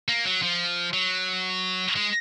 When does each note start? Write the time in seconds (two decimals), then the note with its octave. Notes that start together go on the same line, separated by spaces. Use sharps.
0.08 A#3
0.25 F#3
0.42 F3
0.93 F#3
1.96 G#3